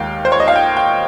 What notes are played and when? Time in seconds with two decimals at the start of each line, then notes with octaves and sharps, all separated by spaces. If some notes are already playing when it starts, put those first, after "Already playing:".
Already playing: D#2 D#3 G#3 F5 G5
0.25 C5
0.32 C#5
0.40 D#5
0.48 F5
0.56 G5
0.77 G5